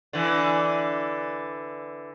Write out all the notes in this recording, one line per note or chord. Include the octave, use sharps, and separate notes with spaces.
D3 E3